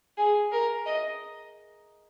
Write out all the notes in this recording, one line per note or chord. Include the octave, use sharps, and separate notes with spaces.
G#4
A#4
D#5